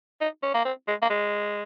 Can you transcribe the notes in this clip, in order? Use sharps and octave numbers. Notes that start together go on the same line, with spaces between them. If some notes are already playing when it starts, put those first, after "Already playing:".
D#4
C#4
A#3
C4
G#3
A#3
G#3